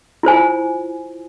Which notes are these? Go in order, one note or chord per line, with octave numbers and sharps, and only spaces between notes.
E4 F4 C5 G#5